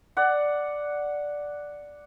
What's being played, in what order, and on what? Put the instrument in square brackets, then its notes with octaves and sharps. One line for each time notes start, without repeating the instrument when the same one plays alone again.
[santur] D5 F#5